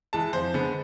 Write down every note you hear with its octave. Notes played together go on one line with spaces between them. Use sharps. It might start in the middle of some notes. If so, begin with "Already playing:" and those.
E3 G#3 A5
F2 C5
D3 G#3 B3